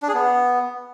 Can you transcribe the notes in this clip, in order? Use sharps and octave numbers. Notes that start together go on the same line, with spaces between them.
D4
G#4
B3